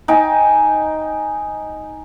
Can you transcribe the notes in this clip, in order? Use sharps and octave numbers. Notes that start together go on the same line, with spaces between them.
D#4 G5 G#5